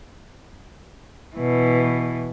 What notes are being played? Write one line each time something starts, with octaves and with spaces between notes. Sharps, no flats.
B2 E3